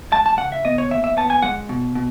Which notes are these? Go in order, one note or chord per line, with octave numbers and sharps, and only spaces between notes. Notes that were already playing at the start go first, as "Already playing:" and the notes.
G#3 A5
A5
C#3 F#5
E5
B3 D#5
C#5
D#2 E5
E5
B3 A5
G#5
G#3 F#5
B2
B2